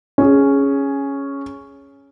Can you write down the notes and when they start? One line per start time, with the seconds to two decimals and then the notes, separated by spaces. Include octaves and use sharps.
0.18 C#4 G#4